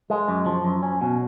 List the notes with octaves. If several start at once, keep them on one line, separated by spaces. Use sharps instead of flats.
G#3
F#2
F3
F#2
C#4
B2